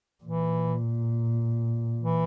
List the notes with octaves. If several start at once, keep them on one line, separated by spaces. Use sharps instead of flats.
A#2 E3
E3